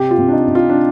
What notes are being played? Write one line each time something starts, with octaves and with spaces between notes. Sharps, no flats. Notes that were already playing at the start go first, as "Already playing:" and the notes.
Already playing: C3 G4
F4
C3
D4
D#4
C3
F4
D4